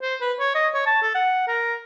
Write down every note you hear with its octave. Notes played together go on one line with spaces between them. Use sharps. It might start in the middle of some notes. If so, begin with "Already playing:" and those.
C5
B4
C#5
D#5
C#5
A5
A4
F#5
A#4